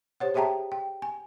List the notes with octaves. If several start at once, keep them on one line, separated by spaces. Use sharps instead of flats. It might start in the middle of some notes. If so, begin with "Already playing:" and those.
G4 C5 C#5 F#5
G4 G#4 E5 G5 A5 A#5
G5
G#5